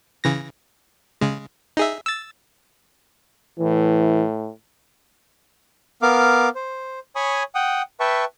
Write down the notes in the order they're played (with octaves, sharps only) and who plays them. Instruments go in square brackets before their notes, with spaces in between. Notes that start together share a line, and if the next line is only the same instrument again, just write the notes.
[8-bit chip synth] C#3 E3 A#6
C#3 G#3
D#4 G#4 E5
E6 A6
[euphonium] A2 [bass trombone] E3
[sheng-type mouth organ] B3 A#4 F5 D6
C5
C#5 G#5 B5 C#6 D#6
F#5 G5 D#6
B4 E5 G5 A5 C#6